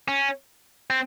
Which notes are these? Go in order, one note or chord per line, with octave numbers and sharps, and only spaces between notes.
C#4
C4